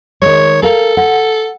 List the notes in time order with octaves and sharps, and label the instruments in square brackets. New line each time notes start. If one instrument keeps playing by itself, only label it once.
[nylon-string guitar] D#3 G#3 [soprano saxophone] C#5
[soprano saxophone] A4 [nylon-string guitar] A#4 F5
[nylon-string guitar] F#5